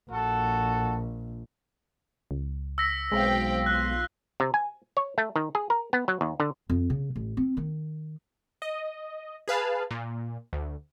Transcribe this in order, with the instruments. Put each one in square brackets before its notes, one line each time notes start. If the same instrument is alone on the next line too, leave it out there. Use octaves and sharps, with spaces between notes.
[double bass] A#1 [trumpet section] F#4 A4
[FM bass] C#2
[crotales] E6 A#6 B6
[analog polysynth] B1 [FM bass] G#3 [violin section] C4 F5 G5
[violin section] F4 C6 [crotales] F#6
[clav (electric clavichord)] C3
G#5
C#5
A3
D#3
G#4
A#4
B3
F#3
D#2
D3
[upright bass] F2
C#3
A1
C4
D#3
[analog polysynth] D#5
G#4 B4 F5 A5
A#2
D2